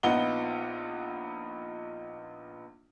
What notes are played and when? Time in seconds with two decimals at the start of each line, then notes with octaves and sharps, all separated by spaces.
0.03 A#1 B3 D#4 F4 F#5 G7